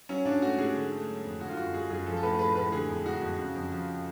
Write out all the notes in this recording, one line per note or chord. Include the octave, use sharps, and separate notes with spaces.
F#3 C#4
G#2 D4
A3 F#4
G#2 G#4
D3
A3
F#3
F2
D3 F#4
F4
F#2 F#4
G#3 G#4
F#2 G#4
F3 A4
A4
A2 B4
G#3 B4
A2 B4
D3 G#4
F2
G#3 F#4
F2
C#3
F2
F3